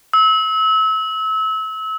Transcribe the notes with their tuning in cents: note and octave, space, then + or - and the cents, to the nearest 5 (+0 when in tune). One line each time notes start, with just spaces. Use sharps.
E6 -30